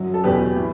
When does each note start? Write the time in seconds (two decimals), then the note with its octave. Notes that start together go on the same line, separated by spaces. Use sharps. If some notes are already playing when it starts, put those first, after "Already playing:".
Already playing: F#2 F#3
0.14 A4
0.24 E2 B2 F#3 G4 B4
0.56 A2